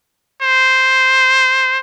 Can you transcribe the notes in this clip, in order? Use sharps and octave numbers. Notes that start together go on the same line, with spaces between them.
C5